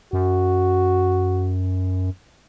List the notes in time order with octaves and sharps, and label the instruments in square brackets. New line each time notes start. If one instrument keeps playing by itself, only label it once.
[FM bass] F#2 [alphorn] F#4